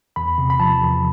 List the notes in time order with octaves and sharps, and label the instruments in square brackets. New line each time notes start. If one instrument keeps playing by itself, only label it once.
[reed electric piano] E2 B5
C3
B5
F3 A5
E2